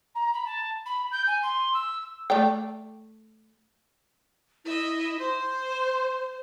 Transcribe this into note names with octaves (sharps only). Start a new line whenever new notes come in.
A#5
B5
A5
B5
G6
G#5
C6
E6
A3 D5 G5
E4 D#5 E5
C5 C6